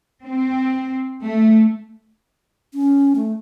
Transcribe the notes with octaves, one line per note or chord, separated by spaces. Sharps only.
C4
A3
C#4
A3